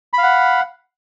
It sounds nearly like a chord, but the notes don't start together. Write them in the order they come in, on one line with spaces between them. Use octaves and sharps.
B5 F5 F#5